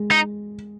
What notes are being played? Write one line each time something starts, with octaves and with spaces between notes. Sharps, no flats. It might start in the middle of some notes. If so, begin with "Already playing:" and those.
Already playing: G#3
D#4